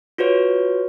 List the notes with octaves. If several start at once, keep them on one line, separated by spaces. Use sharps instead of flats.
F4 F#4 B4 C#5